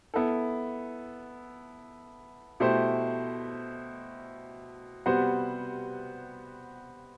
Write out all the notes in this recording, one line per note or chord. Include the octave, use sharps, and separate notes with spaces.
B3 E4 A4
B2 A3 E4 G4 C5
C3 G3 B3 F#4 C5